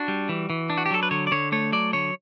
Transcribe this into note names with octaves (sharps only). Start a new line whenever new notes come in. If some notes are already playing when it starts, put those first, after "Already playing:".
Already playing: D4 F#4
G3
E3
E3
D4
F#4
G4
F#3 A4
B4
D3 C#5
D5
D3 C#5
A3 C#5
F#3 D5
D3 C#5